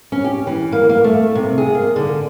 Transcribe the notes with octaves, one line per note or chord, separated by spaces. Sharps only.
C#4
G4
E3
A#3
A#3
A3
C3
G#4
A#3
D3